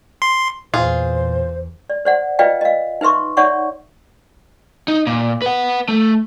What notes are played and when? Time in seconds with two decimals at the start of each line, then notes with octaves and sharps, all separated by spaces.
0.22 C6
0.74 E2 A#2 F4 G#4 C5
1.90 D5
2.05 C5 D5 F#5
2.39 F4 B4 D5 D#5 F5 G5
2.61 D#5 F5
3.01 D#4 B4 E5 C6 C#6
3.37 D#4 C#5 D5 E5 F#5 C#6
4.88 D#4
5.07 A#2
5.42 B4 F#5
5.89 A3